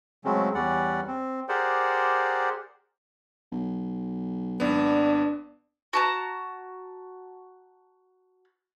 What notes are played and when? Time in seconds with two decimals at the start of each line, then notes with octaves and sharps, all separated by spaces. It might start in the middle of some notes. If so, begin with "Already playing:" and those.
0.25 C#3 F#3 G#3 A3 C4 C#4
0.55 E2 G3 C#4 D5 F#5
1.08 C4
1.49 G4 G#4 A#4 C5 D5 F#5
3.52 B1
4.60 G#1 B3 D4 D5
5.93 F#4 A5 A#5